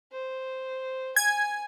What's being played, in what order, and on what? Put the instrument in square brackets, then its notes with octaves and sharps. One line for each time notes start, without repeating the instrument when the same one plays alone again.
[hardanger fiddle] C5
[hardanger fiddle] G#5 [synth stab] G#6